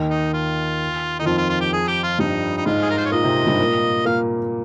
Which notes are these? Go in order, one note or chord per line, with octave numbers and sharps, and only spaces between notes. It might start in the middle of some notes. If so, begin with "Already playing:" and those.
Already playing: D#2 D#3
D#4
F4
D#3 D#4
F2 F3 F4
F4
F4
G4
G#4
G4
F4
G2 G3 D#4
D#4
G#2 G#3 F4
G#4
A#4
C5
C#5
A#2 A#3 D#5
C3 C4
G2 G3
A#2 A#3
A#2 A#3 F5